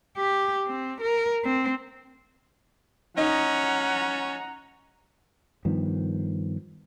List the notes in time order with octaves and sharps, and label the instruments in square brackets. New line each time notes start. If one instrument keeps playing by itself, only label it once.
[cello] G4
C4
A#4
C4
[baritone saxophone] C#4 [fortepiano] D#4 [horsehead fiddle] F#5 A#5
[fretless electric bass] G2 D#3 F3 B3